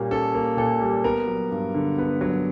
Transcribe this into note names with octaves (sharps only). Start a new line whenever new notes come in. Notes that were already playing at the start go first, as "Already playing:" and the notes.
Already playing: A#2 G3 A#3 C#4
C#4 A4
A#3
A#2 A4
G3
B3 A#4
F#3
G2
D3
B3 B4
F#3